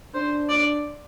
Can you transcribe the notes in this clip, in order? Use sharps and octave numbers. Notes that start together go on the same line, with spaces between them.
D4 C5
D5